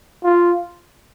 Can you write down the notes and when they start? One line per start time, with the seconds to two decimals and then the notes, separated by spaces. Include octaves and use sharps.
0.24 F4